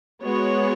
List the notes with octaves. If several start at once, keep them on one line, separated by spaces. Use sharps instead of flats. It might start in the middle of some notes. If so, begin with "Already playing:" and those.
G#3 B3 F#4 C#5